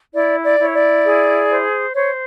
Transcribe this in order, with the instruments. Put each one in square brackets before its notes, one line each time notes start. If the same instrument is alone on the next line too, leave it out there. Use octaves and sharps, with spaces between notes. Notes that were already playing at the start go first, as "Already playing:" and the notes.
[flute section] E4 D5
D5
E4 C#5
D5
G#4
C5
C5 C#5